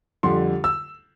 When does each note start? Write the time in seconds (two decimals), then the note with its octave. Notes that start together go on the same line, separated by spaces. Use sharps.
0.23 F2 D3 G3 C6
0.64 E6